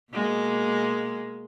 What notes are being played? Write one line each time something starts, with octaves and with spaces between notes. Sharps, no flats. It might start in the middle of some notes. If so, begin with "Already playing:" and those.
B2 G#3 A#3